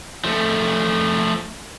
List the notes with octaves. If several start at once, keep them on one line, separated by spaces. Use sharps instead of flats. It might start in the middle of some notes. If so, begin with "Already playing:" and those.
F3 A3